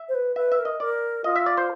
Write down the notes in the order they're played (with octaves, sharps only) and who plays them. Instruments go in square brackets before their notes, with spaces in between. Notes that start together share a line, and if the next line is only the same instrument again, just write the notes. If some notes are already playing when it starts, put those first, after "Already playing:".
Already playing: [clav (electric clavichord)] E5
[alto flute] C5
B4
[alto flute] B4 [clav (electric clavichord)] E5
[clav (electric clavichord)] E5
[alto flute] A#4
[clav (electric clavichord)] D#5
[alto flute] A#4 [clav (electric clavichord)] D5
[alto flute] F4 [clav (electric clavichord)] D#5
[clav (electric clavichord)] E5
D5
C5